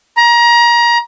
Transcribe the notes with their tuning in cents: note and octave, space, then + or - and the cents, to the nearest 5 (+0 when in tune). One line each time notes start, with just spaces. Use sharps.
A#5 +25